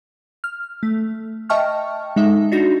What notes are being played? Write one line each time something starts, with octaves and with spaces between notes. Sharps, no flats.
F6
A3
D#5 E5 G5 A5 C#6 F6
G#3 D#4 A4 E5
D4 D#4 F#4 G6 A#6